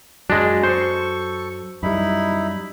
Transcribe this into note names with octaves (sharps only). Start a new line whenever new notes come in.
F#2 F#3 G#3 D4
A4 C5 C#6
F#2 G3 D#4 E4 B5